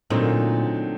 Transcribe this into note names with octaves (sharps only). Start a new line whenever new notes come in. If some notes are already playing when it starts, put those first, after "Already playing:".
A#2 D3 F#3 A3 C4 D#4